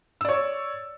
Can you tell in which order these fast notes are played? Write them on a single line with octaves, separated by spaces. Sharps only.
E6 D5 C#5